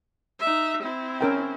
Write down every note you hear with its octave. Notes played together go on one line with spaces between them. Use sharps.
D#4 E5
C4 E4
C#4 A#4 G5